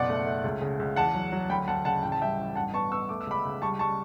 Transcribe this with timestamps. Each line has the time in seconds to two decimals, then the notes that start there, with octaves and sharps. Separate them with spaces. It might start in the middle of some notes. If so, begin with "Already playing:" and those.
Already playing: F#1 B2 D5 F#5
0.09 A3
0.26 A3
0.44 C#2
0.62 C#3
0.79 C#2
0.96 E2 F#5 A5
1.15 F#3
1.32 F#3
1.49 D2 G5 B5
1.68 D2 F#5 A5
1.85 C#3 F#5 A5
2.03 A1 G5
2.12 A5
2.21 G3 E5 G5
2.39 A1
2.56 G2 F#5 A5
2.74 B3 A5 C#6
2.92 B3 C#6 E6
3.09 A3 D6
3.21 E6
3.27 C#2 B5 D6
3.45 C#2
3.62 G3 A5 C#6
3.79 G3 A5 C#6